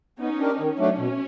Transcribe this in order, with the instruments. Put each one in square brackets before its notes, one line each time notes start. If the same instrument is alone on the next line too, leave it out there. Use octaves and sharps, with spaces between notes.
[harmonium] B3 [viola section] C#4 D#4
[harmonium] D4 G4 A#4
[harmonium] D#3 [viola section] C#4
[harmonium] F#3 A3 D4
B2